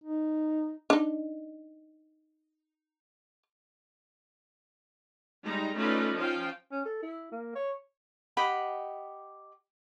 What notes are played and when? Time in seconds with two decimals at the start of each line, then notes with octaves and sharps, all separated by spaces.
0.04 D#4
0.90 D4 D#4
5.46 G3 G#3 D#4 A#5
5.77 A3 C#4 D#4 F4 B4 D5
6.17 F3 C#4 F4 F5 G5
6.72 C#4
6.85 A4
7.03 E4
7.31 A#3
7.55 C#5
8.37 G4 D#5 F#5 B5